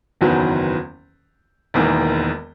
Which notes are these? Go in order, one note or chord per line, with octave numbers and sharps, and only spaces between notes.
F#1 E2 D#3 F#3 B3
E1 E2 D#3 A#3